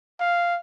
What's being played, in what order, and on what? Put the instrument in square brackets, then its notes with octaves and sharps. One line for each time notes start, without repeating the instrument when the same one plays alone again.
[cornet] F5